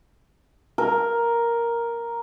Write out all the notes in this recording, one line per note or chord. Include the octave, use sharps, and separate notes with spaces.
A#4